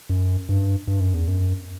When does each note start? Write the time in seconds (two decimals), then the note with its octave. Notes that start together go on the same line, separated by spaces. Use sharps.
0.09 F#2
0.49 G2
0.87 G2
1.00 F#2
1.14 E2
1.28 F#2